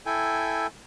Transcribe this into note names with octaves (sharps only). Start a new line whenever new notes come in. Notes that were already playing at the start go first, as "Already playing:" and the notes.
E4 A4 G5 G#5